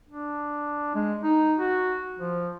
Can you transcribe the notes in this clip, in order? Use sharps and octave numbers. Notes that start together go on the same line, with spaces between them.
D4
G#3
D#4
F#4
F3